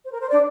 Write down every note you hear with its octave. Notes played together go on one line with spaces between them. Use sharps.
C5
A#4
C5
D4 D5